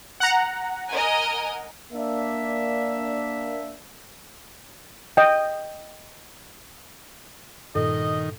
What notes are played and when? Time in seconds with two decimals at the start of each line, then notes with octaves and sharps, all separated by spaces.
0.20 F#5 A#5
0.90 A#4 D#5 G#5
1.92 A#3 D4 E5
5.17 D#5 G5
7.75 G2 A#2 D#3 A4 D#5